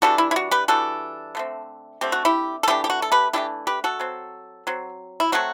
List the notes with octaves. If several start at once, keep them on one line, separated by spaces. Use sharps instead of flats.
E3 G3 D4 F#4 A4
E4
E4
F#4
G4 B4
E3 G3 D4 F#4 A4
D3 A3 C4
D3 A3 C4 G4
F#4
E4 G4
A4
E3 A3 D4 E4 G4
G4
F#4
A4
G4 B4
E3 A3 D4 E4 G4
G4 B4
F#4 A4
F#3 C4
F#3 C4
E4
F#3 A3 C4 F#4